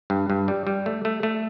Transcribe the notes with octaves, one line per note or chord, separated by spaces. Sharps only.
G2
G2
G3
G3
A3
A3
A3